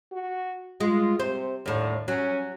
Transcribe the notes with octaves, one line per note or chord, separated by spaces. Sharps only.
F#4
G#3 F4
C3 C5
D#2 A2 D3
F#3 C#4